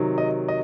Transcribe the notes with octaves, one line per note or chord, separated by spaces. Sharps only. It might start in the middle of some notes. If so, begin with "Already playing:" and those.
Already playing: C3 D#3 F#3
D#5
D#5